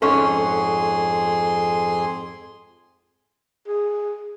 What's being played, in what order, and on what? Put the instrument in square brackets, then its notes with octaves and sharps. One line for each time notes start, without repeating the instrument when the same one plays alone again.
[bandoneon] F2 G#4 C6 [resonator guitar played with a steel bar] G#2 C#4 C#5 [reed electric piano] A4
[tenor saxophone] G#4